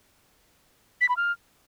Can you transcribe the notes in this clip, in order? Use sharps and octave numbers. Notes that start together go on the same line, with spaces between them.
B6
B5
F6